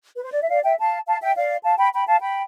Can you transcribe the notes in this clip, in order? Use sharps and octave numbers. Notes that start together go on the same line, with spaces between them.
B4
C5
D5
E5
D5 F5
E5 G5
F5 A5
F5 A5
E5 G5
D5 F5
F5 A5
G5 B5
G5 B5
F5 A5
G5 B5